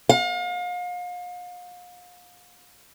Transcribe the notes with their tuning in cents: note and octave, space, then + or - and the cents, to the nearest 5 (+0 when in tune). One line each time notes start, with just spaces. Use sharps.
F5 +40